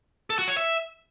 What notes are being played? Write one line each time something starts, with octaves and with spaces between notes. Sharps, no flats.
A4
F#4
C#5
E5